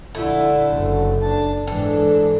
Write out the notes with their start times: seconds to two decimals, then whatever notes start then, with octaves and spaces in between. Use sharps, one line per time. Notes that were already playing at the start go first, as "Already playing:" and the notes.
0.15 A#1 D3 A3 E4
0.72 F#1
1.22 D4 A5
1.67 G#2 E3 D4 A4